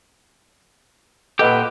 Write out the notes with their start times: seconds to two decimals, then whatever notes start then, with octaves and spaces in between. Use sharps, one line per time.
1.39 A#2 G4 A4 B4 D#5 F#5